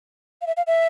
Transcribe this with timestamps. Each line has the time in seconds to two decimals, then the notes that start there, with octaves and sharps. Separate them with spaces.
0.42 F5
0.47 E5
0.57 F5
0.67 E5